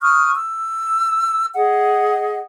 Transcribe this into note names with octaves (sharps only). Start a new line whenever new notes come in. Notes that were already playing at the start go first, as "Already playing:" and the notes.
C#6 D#6 F6 F#6
E6
G#4 D#5 F#5